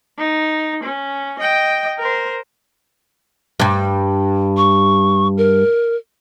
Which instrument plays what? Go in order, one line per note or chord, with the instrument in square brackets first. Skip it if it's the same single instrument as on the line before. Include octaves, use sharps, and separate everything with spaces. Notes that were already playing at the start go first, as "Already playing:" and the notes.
[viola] D#4
C#4
D#5 G5
A#4 C5
[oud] G2 G3
[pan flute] C#6
A#4